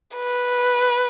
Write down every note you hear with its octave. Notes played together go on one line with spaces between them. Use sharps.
B4